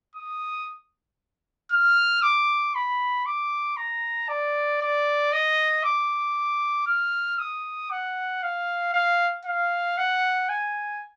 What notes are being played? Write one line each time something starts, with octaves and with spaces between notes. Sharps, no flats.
D#6
F6
D6
B5
D6
A#5
D5
D5
D#5
D6
F6
D#6
F#5
F5
F5
F5
F#5
G#5